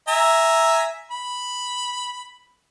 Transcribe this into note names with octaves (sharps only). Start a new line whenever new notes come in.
E5 G#5 A#5
B5